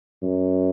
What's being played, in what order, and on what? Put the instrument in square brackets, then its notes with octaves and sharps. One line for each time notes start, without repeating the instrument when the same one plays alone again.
[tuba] F#2